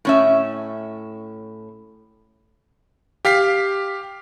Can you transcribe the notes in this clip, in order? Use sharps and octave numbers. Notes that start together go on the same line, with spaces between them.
A2 C#4 E5
G4 F5 B6 C7